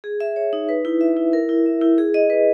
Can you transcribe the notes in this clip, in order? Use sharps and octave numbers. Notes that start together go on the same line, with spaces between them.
G#4
E5
C#5
D#4
B4
E4
E5
E4
A#4
E4
E5
E4
G#4
D#5
B4